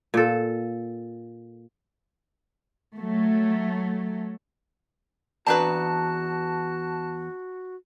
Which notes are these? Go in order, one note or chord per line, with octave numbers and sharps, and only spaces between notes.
A#2 A4
F#3 A3
E2 C4 D4 F#4 B4 A5 A#5